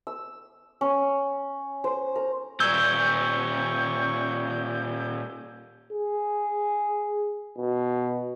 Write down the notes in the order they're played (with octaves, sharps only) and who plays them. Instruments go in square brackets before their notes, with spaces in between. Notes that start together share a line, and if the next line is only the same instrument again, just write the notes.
[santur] E6
C#4
C5
A#4
[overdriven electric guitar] A#2 G3 [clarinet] C#6 [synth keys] E6 G#6 [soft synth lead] G6
[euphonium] G#4
B2